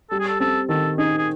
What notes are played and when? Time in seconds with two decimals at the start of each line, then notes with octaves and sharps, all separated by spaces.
0.11 G3 A4
0.20 G#4
0.28 A4
0.40 C4 A4
0.69 D#3 A4
0.98 D#4 G#4
1.18 G#4